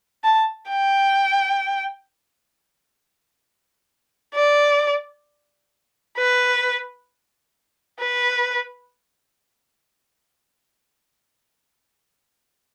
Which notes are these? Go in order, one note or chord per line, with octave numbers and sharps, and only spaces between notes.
A5
G5
D5
B4
B4